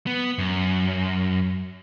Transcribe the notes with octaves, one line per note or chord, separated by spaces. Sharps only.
B3
F#2